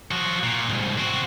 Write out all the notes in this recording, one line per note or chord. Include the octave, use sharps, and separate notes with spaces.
F3 F#4
A#2
C2 G#2
C4 F#4